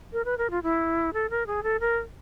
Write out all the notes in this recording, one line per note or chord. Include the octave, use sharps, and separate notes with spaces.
A#4
B4
A#4
F4
E4
A4
A#4
G#4
A4
A#4